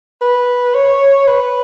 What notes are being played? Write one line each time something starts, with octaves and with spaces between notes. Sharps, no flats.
B4
C#5
B4